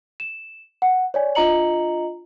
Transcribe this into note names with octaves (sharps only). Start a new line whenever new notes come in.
E7
F#5
C#5 D5 G#5
D4 F4 D#5 A#5 C#7 F#7